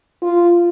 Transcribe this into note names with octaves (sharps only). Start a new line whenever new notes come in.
F4